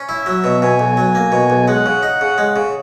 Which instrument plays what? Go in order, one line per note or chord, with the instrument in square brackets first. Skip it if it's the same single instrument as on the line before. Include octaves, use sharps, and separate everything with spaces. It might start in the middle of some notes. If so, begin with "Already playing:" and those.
Already playing: [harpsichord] C#4
[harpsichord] E4 [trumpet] E5
[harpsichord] F#3
B2
[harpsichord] B2 [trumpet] G#5
[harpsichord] B1
F#3
A#3
B2
B1
[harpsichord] G#3 [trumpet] F#5
[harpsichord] C#3
D#4
C#3
G#3
C#3